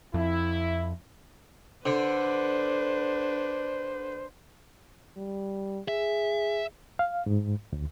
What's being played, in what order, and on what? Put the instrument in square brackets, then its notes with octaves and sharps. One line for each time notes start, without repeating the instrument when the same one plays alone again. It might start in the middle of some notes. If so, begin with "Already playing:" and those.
[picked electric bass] F2 [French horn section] E4
[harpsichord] D3 [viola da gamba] D4 B4 [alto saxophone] C5
[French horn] G3
[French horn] G#4 [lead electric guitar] E5
[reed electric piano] F5
G#2
D2